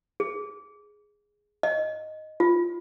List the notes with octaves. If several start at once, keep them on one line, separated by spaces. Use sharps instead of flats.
G#4
D#5
F4